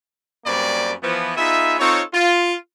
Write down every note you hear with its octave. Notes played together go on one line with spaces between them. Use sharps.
F#2 G3 A#3 C4 B4 D5
E3 F3 B3
B3 D#4 F4 G#4 E5
C4 D#4 F4 A4 C#5
F4